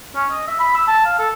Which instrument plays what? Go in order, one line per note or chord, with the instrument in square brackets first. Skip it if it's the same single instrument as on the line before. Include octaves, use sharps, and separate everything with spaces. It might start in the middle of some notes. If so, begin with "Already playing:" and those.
[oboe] C#4
D#5
E5
B5
E6
A5
F5
A4